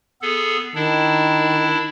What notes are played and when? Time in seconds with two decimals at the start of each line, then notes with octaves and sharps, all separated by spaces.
0.22 B3 G#4 A4
0.75 D#3 D4 E4